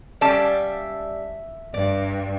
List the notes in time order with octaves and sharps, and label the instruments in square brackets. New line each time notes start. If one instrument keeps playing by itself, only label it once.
[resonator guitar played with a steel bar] G3 C#4 D5 [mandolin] E5 F5 A5
[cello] G2 [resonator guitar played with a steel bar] D5